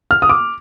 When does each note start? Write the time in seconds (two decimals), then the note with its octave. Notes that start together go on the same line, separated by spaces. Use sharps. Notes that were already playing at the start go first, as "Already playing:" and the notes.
0.11 F6
0.22 D#6
0.29 D6